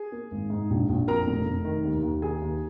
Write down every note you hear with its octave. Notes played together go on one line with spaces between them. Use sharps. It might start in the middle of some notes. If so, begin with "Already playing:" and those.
Already playing: G#4 G#5
A#3
G#1
G#2
A#1
A#1
F2 A#4 A#5
F1
F1
D#3
D#2
D#2
D#3 G#4 G#5
D#2